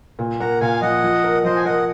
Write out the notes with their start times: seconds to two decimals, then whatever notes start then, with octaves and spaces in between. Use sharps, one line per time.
0.19 A#2
0.40 A#3 F#5 A#5
0.60 A#2 F5 G#5
0.81 F3 D#5 F#5
1.03 F3
1.24 A#4
1.44 F3 C5 D#5
1.56 G#5
1.65 A#4 D#5 F#5